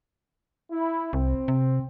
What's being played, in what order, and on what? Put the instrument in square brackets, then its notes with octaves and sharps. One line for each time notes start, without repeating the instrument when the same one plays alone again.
[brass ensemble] E4
[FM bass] C2 [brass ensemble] C4
[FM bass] C3